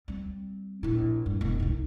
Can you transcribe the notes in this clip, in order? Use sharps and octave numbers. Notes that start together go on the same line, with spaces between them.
G3 C4
A#1 E4
G2
E1 B3
C2 D#4